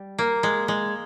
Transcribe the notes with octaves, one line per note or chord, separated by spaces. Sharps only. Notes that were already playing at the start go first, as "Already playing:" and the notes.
Already playing: G3
A#3
G#3
G#3